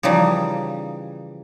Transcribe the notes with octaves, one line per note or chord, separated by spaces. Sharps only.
C#3 E3 F3 G3 D#4